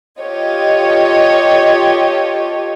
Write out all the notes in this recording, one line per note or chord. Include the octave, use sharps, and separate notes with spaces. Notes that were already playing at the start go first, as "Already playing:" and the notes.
F4 G4 A4 C#5 D#5